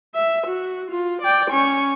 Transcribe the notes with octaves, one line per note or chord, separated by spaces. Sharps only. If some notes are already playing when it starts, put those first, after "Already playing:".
E5
F#4
F4
D5 G5
C#4 C#6